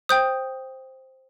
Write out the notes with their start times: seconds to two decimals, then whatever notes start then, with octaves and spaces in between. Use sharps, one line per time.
0.09 C5 G5 D#6 G6